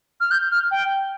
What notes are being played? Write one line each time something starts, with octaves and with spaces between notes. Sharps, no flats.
F6
G6
F6
G5